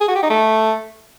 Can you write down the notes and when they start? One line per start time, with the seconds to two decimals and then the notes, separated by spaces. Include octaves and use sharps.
0.01 G#4
0.08 F#4
0.15 G4
0.22 D#4
0.30 A3